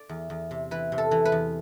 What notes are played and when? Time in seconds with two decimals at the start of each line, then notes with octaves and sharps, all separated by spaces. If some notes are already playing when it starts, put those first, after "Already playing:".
Already playing: D5
0.09 E2
0.30 E2
0.51 C3
0.71 E3 B4
0.92 C3
0.98 A4
1.11 E3
1.25 B4
1.32 E2